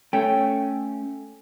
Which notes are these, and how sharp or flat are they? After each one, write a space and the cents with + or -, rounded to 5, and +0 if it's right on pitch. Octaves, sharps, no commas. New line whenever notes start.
A3 +0 C#4 +0 G5 +0